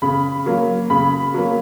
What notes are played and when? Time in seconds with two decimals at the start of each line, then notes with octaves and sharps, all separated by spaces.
0.02 C#3 B5
0.46 F#3 A#3
0.90 C#3 B5
1.34 F#3 A#3